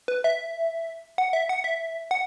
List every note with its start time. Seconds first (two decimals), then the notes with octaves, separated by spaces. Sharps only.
0.08 B4
0.24 E5
1.18 F#5
1.33 E5
1.49 F#5
1.64 E5
2.11 F#5